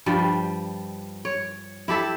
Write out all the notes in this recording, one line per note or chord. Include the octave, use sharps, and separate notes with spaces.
G2 F3 G3
C#5
E4 G4 A4 E5